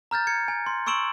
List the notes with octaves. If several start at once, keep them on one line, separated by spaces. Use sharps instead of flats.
A#5 F6 G6 A6
G#6 C#7
G#5
C6
C6 C#6 E6 D7 E7 F#7